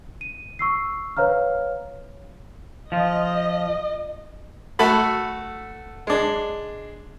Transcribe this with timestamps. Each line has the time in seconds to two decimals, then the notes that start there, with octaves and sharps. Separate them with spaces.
0.21 D#7
0.59 C#6 E6 C7
1.17 B4 C#5 F5 A#5 F6
2.92 F3 F4 D#5
4.79 A3 F#4 A4 B5
6.07 G#3 D4